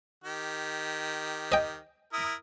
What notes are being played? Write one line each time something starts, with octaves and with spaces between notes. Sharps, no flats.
D#3 G4
D#5 G5
E4 A#4 D#6